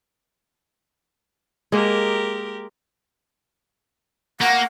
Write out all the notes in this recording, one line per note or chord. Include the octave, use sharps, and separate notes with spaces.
G#3 A#3 G4 A#4 D#5
A#3 F#5